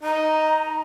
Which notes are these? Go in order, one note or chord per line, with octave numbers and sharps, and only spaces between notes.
D#4 A#5